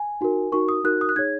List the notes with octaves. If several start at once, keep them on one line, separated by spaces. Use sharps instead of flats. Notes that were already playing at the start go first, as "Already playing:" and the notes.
Already playing: G#5
D#4 F#4 A#4
D#4 F#4 A#4 C#6
D#6
D#4 F#4 A#4 F#6
D#6
F#6
D#4 G#4 C#5 G#6